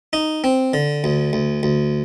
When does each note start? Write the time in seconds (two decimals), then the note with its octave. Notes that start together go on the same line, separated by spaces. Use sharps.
0.13 D#4
0.44 C4
0.73 D3
1.04 D2
1.33 D2
1.63 D2